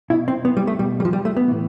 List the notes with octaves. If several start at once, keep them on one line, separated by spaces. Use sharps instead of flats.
B2 E4
C4
B3
G3
A3
B2 G3
G3
F3
G3
A3
B3
A2 E3